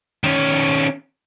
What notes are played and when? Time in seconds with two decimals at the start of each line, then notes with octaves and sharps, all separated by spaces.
0.24 D#3 C#4